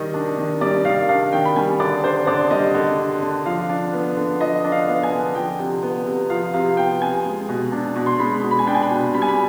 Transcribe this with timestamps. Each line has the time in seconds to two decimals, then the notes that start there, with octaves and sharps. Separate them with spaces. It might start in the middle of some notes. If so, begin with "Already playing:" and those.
Already playing: D#3 G3 D#5
0.14 D4
0.37 D#3
0.61 G3 D5
0.85 D#3 F5
1.09 D4 F5
1.32 D#3 G5
1.45 B5
1.56 G3 G#5
1.80 D3 D5
2.04 D4 C5
2.27 D3 D5
2.50 G3 D#5
2.74 D3
2.98 D4
3.22 D3
3.46 F3 F5
3.69 D4
3.93 B3
4.16 D3
4.40 F3 D#5
4.64 D4
4.72 F5
4.88 B3
5.03 G#5
5.11 D3
5.35 F3 G5
5.59 C3
5.83 B3
6.06 C3
6.30 F3 F5
6.54 C3 F5
6.77 B3 G5
7.01 C3 G#5
7.25 G#3
7.49 B2
7.72 D4
7.96 B2
8.06 C6
8.19 G#3 B5
8.43 B2
8.51 B5
8.59 G#5
8.66 D4 G5
8.75 G#5
8.82 B5
8.90 B2
9.14 G3 B5
9.22 G#5
9.28 B5